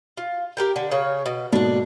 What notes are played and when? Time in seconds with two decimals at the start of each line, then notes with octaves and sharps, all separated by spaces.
0.17 F4
0.57 G4 A#4 G5
0.76 D3
0.91 C#3 C#5
1.26 B2
1.53 G#2 B2 D3 A#3 D4